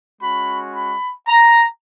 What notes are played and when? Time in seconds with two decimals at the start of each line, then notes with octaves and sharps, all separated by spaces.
0.21 G#3 C#4 F#4 B5
0.74 B5
1.28 A#5